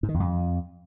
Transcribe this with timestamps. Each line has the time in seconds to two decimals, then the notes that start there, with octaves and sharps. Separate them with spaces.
0.03 G#2
0.09 D#3
0.14 E2
0.20 F2